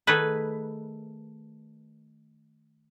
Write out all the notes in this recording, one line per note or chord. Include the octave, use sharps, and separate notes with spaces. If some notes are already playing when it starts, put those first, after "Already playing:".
D#3 A3 G#4 B4